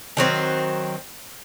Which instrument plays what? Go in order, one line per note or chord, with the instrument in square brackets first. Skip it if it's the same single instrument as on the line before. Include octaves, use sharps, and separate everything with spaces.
[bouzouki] D#3 F#3 C4